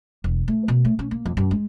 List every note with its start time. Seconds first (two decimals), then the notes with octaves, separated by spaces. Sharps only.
0.24 E1
0.48 A3
0.68 B2
0.85 A3
0.99 C#4
1.11 A#3
1.25 F2
1.37 F#2
1.51 G#3